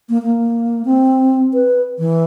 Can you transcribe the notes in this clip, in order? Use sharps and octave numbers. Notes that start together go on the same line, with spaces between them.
A#3
A#3
C4
B4
E3